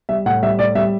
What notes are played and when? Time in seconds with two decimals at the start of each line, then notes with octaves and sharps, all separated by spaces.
0.09 G3 E5
0.26 A2 F#5
0.43 G3 E5
0.59 A2 D5
0.75 G3 E5